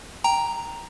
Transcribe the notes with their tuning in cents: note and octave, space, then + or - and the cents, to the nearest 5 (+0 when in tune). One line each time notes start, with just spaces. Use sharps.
G5 +0 A#5 +0